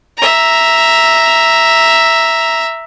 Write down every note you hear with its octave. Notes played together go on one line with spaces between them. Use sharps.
E5 A#5